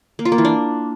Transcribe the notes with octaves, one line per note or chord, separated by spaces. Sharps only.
A#3
F4
A#3
E3
D4